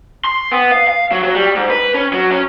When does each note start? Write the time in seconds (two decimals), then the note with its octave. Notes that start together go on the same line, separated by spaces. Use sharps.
0.25 C6
0.52 B3
0.72 F5
0.87 F5
1.11 F#3
1.23 F#3
1.35 G3
1.55 G#2
1.70 B4
1.94 C#4
2.13 F#3
2.31 C#4